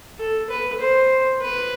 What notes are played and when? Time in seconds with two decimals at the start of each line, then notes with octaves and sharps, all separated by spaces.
0.19 A4
0.50 B4
0.81 C5
1.42 B4